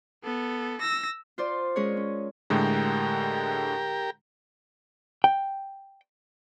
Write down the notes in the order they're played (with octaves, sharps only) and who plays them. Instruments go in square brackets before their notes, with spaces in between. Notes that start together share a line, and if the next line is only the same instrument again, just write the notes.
[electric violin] B3 A4
E6 A#6
[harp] F4 C5 D5
G#3 C#4 G#4 A#4 C#5
C#4
[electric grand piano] A2 D3 G#3 [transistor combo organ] G4 A#4
[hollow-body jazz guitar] G5